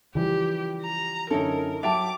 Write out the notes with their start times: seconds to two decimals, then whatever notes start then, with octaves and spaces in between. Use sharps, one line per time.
0.15 C#3 E3 F3 G3 G4
0.83 A#5
1.31 F#2 D3 C#4 D#4 E4 A4 A#4
1.83 F#3 E5 G5 A5 D6 A6 F7